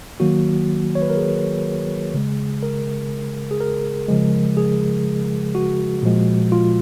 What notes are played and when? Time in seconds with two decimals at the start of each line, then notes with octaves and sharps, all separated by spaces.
0.20 D#3 F#3 A#3 F#4
0.95 C#5
1.02 B4
1.10 A#4
1.17 G#4
2.14 C#3 G#3
2.63 A#4
3.51 G#4
3.61 A#4
4.08 C#3 F3 G#3
4.57 G#4
5.55 F#4
6.03 A#2 F3 G#3
6.52 F4